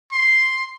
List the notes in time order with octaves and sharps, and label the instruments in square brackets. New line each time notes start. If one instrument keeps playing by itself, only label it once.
[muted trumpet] C6